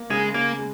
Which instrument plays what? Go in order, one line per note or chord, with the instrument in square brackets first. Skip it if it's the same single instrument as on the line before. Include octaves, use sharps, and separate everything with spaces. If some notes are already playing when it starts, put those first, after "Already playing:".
Already playing: [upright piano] A#3
[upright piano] C#3 [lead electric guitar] G#3
[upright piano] C#3 [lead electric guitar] A#3
[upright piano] G#3